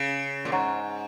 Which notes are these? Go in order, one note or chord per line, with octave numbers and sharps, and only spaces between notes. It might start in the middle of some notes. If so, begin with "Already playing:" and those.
Already playing: C#3
A#2
G#2 C#5 F#5 A#5 C#6